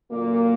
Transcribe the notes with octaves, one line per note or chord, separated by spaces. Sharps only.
F#2 A#2 D3 A#3